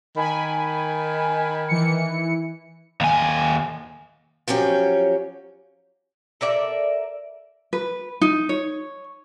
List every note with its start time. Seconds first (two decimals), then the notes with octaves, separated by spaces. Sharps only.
0.16 D#3 G#5 B5
1.68 E3 C#7
3.01 D#2 G#5
4.48 F3 F#3 C#4 G4
6.41 A4 A#4 D5 E5
7.73 B4
8.21 D#4
8.49 C#5